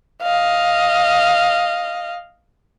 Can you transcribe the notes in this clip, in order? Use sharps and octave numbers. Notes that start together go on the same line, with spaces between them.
D#5 F5